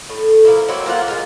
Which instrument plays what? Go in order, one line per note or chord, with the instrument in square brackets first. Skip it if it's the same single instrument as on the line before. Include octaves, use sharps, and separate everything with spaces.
[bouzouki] A2
F3 A#3 E4
F#3 A#3 C4 E4
A#3 F4 C5 F#5
G#3 F4